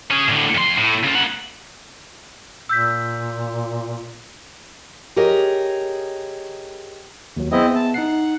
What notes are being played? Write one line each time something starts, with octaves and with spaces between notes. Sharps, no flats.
C#4 G#4
A2 D3
F2 C6
A2
C#3 F4
A#3 F#5
A#2 E6 G6 B6
G4 G#4 A#4 C#5 D#5
D#2 F#3
B3 C4 E4 G#4 D#5 E5
A5
D#4 F#5 C7